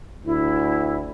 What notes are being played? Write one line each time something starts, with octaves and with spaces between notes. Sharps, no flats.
D2 E4